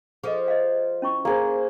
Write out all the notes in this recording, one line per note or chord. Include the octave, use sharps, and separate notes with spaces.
F3 G#4 A4 D#5
D#5 F5
C#4 E4 C#6
A#3 G#4 C5